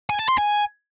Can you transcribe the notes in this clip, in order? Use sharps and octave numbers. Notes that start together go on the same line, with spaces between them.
G#5
A5
C6
G#5